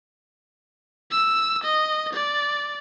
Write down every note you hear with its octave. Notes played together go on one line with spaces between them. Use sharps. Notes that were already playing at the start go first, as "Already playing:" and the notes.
E6
D#5
D5